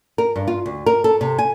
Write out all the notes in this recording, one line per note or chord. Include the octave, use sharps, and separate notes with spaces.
A#4
G2
F4
D2
A#4
A4
C3
G#5